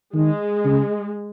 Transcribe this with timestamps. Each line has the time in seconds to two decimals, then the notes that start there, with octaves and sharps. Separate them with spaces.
0.14 D#3 G#3
0.65 C#3